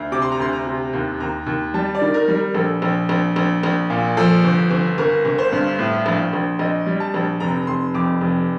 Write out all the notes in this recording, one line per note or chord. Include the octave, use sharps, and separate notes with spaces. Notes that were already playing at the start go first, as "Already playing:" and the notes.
Already playing: D2
C3 D6
C6
A#5
D2 C6
A#5
C3
D#2
D#2 A#5
D#2
G3 A5
D5
D#3
A#4
G3
A#4
A#1 A4
A#1
A#1
A#1
A#1
A#2
F3 A4
G1
G1
G1 A#4
G1
C5
G2
A2
A#1
A#1
A#1 D#5
G3
A5
A#1
F1 A#5
F1 C6
F2 D6
F1